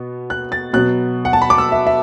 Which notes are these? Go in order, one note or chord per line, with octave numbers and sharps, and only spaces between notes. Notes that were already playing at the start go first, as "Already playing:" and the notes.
Already playing: B2 B3
F#6
A6
B2 F#3 B3 F#6
F#5
A5
B5
D6
E6
E5
E5